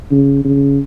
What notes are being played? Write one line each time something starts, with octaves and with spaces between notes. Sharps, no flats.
C#3
C#3